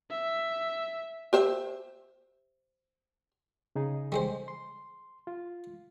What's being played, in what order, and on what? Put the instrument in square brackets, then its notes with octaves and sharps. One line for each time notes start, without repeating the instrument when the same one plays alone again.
[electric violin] E5
[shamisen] G4 C5 E5
[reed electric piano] C#3 D#4 G#4
[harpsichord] G3 G#3 C5
[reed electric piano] C6
F4